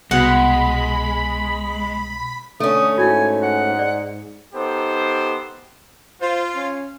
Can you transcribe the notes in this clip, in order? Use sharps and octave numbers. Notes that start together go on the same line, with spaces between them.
C2 B2 G#3 F#5 B5
D3 A3 C#4 D#6
G#2 E4 F#4 G#5
F#5
D5
B3 D#4 G4 A4 C5
F4 C5
C#4